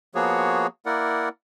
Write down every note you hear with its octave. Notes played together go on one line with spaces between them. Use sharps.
F3 A#3 B3 F#4 G#4 C#5
A#3 E4 A#4 D5 F#5